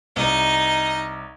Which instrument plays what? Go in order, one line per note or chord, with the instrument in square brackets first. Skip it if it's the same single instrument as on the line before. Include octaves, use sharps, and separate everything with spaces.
[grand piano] C2 [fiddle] D#4 D#5